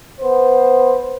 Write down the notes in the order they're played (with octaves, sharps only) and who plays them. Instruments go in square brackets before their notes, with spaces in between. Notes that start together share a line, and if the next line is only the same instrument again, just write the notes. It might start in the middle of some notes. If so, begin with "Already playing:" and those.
[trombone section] B3 C5